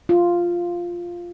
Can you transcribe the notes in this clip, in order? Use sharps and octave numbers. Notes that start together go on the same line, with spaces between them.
F4